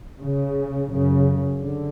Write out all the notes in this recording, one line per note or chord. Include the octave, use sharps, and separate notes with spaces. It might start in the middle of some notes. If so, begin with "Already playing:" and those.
C#3
F#2 C#3
D3